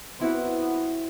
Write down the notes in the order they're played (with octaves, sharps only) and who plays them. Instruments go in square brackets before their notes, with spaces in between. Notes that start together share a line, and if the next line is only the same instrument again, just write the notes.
[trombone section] B3 [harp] C4 E4 F#4